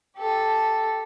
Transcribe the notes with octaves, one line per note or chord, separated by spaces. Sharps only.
G4 A4